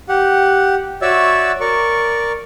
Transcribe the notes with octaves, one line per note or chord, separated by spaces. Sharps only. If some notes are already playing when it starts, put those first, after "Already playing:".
G4 F#5
F#4 C#5 D5 E5 E6
A#4 D5 C#6